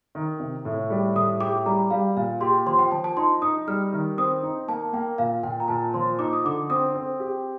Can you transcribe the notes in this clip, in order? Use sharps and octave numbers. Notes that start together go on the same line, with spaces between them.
D#3
C3
A2
G3
A2 D#6
G4 D6
G3 A#5
G3 F5
A#2 F5
G4 C6
F3 C6
G5
F3 A5
A5
D#4 C6
D#4 D#6
G3 F6
D#3
C4 D#6
D#4
A#3 A5
A#3 G5
A#2 F5
A#2 G5
A#5
A#2 A5
F3 C6
D#4 D6
D#6
D3 D6
C4 D#6
C4
G4